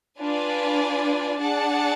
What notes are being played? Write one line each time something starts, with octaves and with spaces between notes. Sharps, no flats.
D4 F4 B4 D5 G#5
D4 G#4 D5 F#5 A5